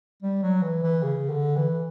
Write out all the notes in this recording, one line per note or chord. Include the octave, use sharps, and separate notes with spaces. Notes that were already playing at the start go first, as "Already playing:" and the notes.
G3
F#3
E3
E3
C#3
D3
E3